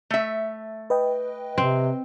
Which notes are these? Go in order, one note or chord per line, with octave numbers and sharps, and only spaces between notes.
A3 E5
B4 D#5 G5
C3 C4